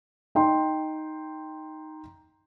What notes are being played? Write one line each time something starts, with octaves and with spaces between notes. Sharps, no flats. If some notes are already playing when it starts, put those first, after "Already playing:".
D#4 G5 C6